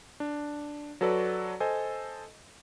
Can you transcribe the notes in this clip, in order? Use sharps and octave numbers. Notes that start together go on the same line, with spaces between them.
D4
F#3 F#4 A4 B4 D5
A4 C5 D#5 G#5